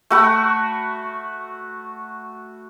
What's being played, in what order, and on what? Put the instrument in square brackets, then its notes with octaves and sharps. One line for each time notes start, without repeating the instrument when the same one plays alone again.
[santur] A3 F#4 B5